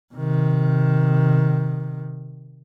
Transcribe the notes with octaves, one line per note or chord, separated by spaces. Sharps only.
C3 D#3